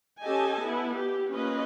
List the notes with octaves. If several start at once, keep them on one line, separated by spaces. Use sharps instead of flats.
C#4 G4 A4 D#5 G#5 A5
B3 E4
G4
A#3 C#4 F4 B4 D#5